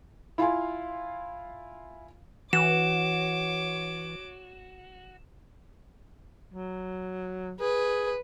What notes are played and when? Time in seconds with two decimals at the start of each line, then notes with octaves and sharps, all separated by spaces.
0.38 E4 F4 F5 G#5 C6
2.53 E3 F#4 C#5 D6 E7
6.53 F#3
7.60 G#4 B4